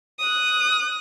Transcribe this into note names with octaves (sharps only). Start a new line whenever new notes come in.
D#6 F#6